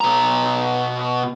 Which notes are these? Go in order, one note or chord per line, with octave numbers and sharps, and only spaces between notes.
B2 A#5